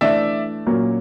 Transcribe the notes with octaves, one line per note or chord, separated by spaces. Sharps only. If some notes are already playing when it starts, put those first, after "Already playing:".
E3 A3 D4 D5 E5
A#2 F#3 A#3 C#4